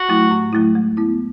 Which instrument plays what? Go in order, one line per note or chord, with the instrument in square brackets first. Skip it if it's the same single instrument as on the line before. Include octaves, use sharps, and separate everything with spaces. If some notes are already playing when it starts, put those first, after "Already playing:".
Already playing: [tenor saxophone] F#4
[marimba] F#3 A3 E4
A2
F#3 A3 E4
G#3
B3 E4